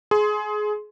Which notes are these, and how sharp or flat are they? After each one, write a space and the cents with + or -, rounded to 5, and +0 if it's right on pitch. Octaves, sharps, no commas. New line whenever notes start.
G#4 +20 C6 +0